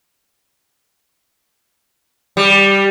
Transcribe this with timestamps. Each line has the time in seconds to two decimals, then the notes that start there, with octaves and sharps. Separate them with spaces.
2.37 G3